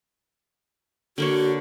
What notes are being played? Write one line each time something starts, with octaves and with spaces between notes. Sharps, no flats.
D3 A#3 F#4 C#5